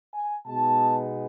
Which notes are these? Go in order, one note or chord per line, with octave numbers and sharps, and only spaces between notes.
G#5
B2 G#3 B3 D#4 A5